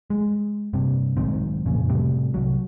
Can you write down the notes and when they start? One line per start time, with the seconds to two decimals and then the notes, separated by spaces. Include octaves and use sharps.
0.10 G#3
0.73 G2 C3
1.17 B1 G#2 D#3 C4
1.66 F2 A#2 C#3
1.89 A2 C3 G3
2.34 C2 F#3